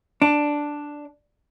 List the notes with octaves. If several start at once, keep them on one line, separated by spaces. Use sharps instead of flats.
D4